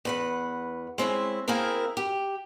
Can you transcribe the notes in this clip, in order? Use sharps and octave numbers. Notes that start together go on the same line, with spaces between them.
E2 B4 F#5
G#3 C4 C#4 E4
A#3 C4 E4 G#4 A#4
G4